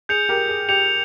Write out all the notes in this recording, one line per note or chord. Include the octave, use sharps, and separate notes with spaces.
G#4 G6 C#7 F7
G4 A#4
G#4
G4 G6 C#7 F7